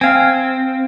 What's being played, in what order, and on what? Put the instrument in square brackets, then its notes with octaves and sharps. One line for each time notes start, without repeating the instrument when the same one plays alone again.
[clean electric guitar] C4 [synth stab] F5 G#5